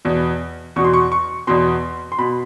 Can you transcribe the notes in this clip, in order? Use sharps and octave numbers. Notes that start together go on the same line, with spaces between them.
E2 B2
E2 B2 C#6
C6
C#6
C#6
E2 B2 C6
C6
B2 B5